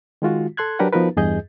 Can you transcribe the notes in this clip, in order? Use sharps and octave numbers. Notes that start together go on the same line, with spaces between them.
D#3 G#3 F4 F#4
A4 C6 F#6 G#6
F#3 D4 G4 A#4 B4 F#5
F3 B3 D#4 F#4 A#4 B4
E2 G2 G#4 D#5 G6